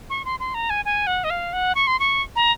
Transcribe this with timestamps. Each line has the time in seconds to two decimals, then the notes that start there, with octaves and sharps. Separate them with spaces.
0.10 C#6
0.25 C6
0.40 C6
0.54 A#5
0.70 G#5
0.85 G#5
1.07 F#5
1.24 D#5
1.30 F5
1.53 F#5
1.75 C#6
1.87 C6
2.00 C#6
2.36 A#5